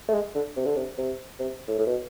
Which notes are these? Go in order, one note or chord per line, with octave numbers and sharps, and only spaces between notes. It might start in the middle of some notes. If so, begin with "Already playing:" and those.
A3
G#3
D3
C3
D3
C3
C3
C3
A2
A2
B2